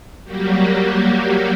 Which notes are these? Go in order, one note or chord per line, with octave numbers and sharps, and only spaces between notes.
F#3 G3 A#3 F#4 G4